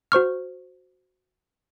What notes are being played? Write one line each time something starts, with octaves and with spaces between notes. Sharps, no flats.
F#4 C5 C#6 F6